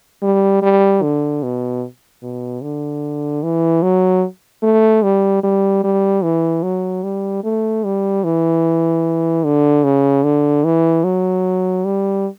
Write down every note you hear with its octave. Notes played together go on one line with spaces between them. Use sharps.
G3
G3
D3
B2
B2
D3
E3
F#3
A3
G3
G3
G3
E3
F#3
G3
A3
G3
E3
D3
C#3
D3
E3
F#3
G3